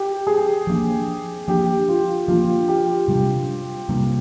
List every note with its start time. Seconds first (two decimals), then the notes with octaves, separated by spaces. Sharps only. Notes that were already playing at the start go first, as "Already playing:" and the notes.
Already playing: G4
0.27 G#4
0.67 F3 A#3 D4
1.48 F3 A#3 D4 G4
1.89 F4
2.28 F3 A#3 D4 F4
2.68 G4
3.08 C3 G3 A#3 D4
3.89 C3 G3 A#3 D4